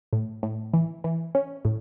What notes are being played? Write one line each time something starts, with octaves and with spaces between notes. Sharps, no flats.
A2
A2
E3
E3
C#4
A2